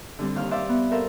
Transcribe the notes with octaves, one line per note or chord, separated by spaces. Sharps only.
D3 G3 C4
D#2 C5 F5 F6
C5 D5 E5 F5
B3
A4 A#4 C5 E5 F5